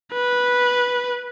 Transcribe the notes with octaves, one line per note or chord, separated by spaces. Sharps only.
B4